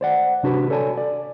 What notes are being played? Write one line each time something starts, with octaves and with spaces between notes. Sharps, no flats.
C5 D5 F#5
C3 D4 F#4 G4 B4
A4 C#5 D5 G#5 A5
D5